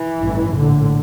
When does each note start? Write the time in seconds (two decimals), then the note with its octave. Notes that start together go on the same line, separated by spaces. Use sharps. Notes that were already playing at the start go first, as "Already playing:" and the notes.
Already playing: E3
0.20 A1 G2
0.55 A#1 A2 D3